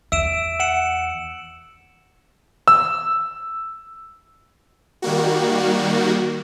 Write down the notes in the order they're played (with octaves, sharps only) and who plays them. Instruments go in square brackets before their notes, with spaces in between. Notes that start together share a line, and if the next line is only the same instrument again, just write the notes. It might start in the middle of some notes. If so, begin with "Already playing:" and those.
[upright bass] E2 [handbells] E5 [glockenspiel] E6 D7 E7
[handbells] F#5 [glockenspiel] C#7 E7 F#7
[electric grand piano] E6
[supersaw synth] D#3 G3 A#3 F#4